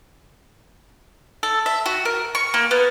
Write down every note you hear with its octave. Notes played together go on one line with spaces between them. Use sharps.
A4
E5
F#4
A#4
C#6
A#3
B3